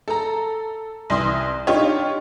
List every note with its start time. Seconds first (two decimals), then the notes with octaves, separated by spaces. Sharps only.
0.08 A4 A#5
1.10 C2 E3 C6 D#6
1.67 D4 D#4 F4 G4 C#5